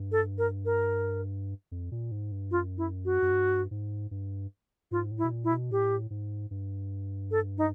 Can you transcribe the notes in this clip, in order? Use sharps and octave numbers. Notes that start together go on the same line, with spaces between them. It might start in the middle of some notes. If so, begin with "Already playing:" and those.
Already playing: G2
A4
A#4
A#4
F2
A#2
G#2
G2
F#2 F4
E4
F#4
F#2
G2
G#2
G2
G#2 F4
A2
E4
B2
A#2
E4
B2
A2 G4
G#2
G2
A4
D#4